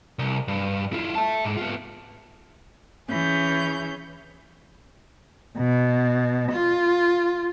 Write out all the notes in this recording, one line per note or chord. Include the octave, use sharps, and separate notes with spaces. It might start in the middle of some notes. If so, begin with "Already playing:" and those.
C2
G2
E4 F4
E5 A5
G#2
B3 F4
E3 C#4 G#4 G6
B2
F4